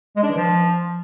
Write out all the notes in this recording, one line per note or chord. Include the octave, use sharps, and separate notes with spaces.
G#3
D4
E3
F3